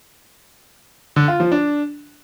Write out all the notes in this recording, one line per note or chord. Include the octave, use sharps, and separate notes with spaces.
D3
F4
F3
D4